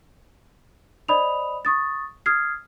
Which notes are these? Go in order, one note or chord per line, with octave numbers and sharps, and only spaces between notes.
C5 D5 D#5 B5 D#6 F7
C#6 D#6 A6
D#6 F6 G#6 C7